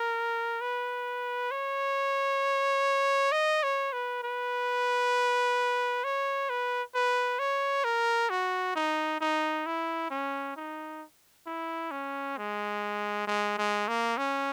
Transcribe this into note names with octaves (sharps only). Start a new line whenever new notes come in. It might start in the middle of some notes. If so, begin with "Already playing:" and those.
Already playing: A#4
B4
C#5
D#5
C#5
B4
B4
C#5
B4
B4
C#5
A#4
F#4
D#4
D#4
E4
C#4
D#4
E4
C#4
G#3
G#3
G#3
A#3
C#4